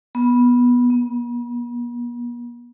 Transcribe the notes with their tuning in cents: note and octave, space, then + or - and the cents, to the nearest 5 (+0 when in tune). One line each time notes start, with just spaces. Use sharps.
B3 -15
B3 -45